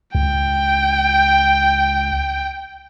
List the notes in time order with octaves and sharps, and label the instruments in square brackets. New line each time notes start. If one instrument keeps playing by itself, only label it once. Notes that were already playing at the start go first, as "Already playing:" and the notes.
[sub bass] C#2 [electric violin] G5